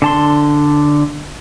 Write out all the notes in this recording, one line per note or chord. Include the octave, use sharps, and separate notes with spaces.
D3 A5 C6